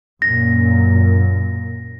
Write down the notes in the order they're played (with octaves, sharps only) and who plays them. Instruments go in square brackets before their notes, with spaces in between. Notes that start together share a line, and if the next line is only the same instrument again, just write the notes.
[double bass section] F#2 A#2 [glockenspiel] A#6